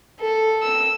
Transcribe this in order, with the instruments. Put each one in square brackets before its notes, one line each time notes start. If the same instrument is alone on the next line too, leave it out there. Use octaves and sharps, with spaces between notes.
[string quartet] A4
E6